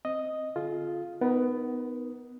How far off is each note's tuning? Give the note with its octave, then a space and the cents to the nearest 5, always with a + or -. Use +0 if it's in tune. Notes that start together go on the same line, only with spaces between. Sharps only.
C4 +0 D#5 +0
D3 +0 F4 +0 G#4 +40
B3 +15 D#4 -5 A#4 +40